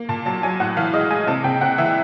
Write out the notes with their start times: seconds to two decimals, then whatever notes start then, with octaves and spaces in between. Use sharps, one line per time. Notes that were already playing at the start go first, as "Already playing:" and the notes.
Already playing: A#3
0.09 A#2 A5
0.26 F#3 A5
0.43 F#3 G#5
0.60 A2 F#5
0.77 E3 F5
0.93 G#3 D#5
1.10 G#3 G#5
1.27 C3 A5
1.44 C3 G5
1.61 C3 F#5
1.78 E3 E5